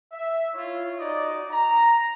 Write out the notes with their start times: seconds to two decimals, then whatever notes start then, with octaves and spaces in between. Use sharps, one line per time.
0.12 E5
0.54 E4 F4 C#5
0.99 D#4 F#4 D5 D#5
1.51 A#5